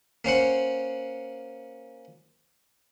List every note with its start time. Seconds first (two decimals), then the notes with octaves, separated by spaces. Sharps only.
0.25 A#3 C#4 C5 F#5